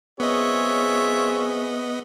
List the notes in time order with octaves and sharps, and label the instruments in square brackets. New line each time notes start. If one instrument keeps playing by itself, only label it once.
[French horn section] F#2 C4 G#4 [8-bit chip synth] B3 D#5 [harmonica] F4 C#5 E5